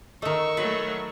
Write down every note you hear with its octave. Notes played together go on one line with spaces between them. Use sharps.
D#3 A3 A#4 D#5 C#6 E6
F#3 A3 B4